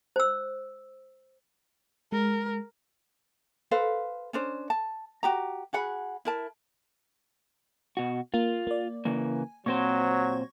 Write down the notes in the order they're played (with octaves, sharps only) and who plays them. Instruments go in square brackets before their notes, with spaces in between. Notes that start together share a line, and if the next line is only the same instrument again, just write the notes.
[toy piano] C5 E6
[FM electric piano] G#3 [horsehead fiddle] A#4
[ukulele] A4 B4 C5 F5
C#4 D4 C5
A5
F#4 G4 A#5
F#4 G#4 F#5 B5
E4 A#4 A5
[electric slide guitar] B2 F#4
[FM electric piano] A#3 [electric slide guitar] F4
[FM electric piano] A#3 D5
[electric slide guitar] C#3 E3 A#3 [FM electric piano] G#5
[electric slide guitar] A#2 C4 C5 [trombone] F#3 [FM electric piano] C#6 G#6 A#6